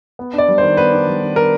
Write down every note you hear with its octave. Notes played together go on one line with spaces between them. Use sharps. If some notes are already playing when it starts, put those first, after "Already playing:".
B3
D4 D5
G3
C5
D#3
B3 B4
D4
G3
D#3
B3 A#4